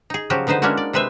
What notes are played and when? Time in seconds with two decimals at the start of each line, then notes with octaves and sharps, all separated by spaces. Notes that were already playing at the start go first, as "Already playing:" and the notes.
0.10 D#4 G#4
0.30 C#3 F3 F#3 F#4 G4
0.47 D3 B3 D#4 B4 C5
0.62 G#3 A#3 C#4 D4 E4 F#4
0.77 D5
0.93 C3 G#3 B4 C5 E5